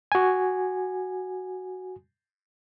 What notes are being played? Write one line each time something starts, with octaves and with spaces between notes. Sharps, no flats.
F#4 G#5